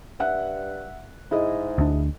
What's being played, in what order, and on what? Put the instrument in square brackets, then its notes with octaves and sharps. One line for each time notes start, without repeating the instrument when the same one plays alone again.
[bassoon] G2 [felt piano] E5 F#5 F#6
[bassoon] G#2 [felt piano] E4 G#4 D#5
[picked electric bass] D2 D4